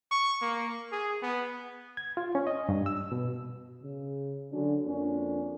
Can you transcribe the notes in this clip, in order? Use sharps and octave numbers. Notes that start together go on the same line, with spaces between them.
C#6
A#3
G#4
B3
G#6
F4
C#4
D#5
G2
E6
B2
C#3
D3 F#3 C#4 D4
F2 A#3 C#4 D4